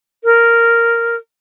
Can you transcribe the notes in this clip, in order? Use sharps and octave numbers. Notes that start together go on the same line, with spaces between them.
A#4